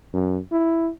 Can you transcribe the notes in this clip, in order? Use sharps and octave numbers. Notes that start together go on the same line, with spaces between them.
F#2
E4